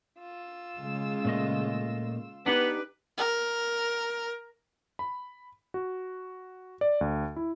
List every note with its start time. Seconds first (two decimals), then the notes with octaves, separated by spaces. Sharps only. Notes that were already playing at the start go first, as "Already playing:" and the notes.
0.19 F4 E6
0.78 C#3 G#3
1.25 A#2 A3 D#5
2.46 B3 D4 D#4 G4 B4
3.18 A#4
4.99 B5
5.74 F#4
6.81 D5
7.01 D2
7.36 E4